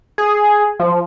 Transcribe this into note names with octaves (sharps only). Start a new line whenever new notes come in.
G#4
F3